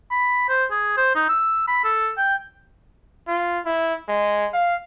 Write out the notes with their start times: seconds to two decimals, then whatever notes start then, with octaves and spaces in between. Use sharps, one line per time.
0.11 B5
0.49 C5
0.71 G#4
0.97 C5
1.15 D#4
1.29 E6
1.68 B5
1.84 A4
2.17 G5
3.28 F4
3.66 E4
4.08 G#3
4.54 F5